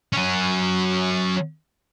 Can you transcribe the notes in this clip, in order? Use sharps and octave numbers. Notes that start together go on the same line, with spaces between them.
F#3 C#4